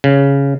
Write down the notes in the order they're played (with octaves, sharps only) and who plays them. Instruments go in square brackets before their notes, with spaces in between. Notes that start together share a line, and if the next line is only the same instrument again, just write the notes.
[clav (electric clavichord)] C#3